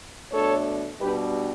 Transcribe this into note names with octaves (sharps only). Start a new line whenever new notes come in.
B2 A3 D4 A4 C#5
B2 G3 D4 G4 B4